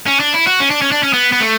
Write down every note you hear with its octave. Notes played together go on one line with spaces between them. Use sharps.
C#4
D4
E4
F#4
C#4
D4
C#4
D4
C#4
B3
B3
A3